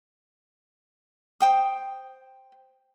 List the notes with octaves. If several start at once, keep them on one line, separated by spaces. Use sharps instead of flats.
C5 G5 D#6